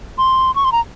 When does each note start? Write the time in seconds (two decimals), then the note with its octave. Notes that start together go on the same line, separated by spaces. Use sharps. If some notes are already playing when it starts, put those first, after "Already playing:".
0.18 C6
0.56 C#6
0.65 C6
0.72 A#5